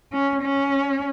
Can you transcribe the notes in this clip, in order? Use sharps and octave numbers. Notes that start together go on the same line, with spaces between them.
C#4
C#4